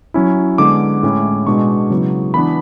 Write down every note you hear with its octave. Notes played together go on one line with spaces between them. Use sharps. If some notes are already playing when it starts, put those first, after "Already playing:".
F#3 C#4 E4
D3 G#3 B3 D6
A2 G#3 C#4 E4
B2 G#3 D4 C#6
C#3 F#3 B3 E4
E3 B3 D4 B5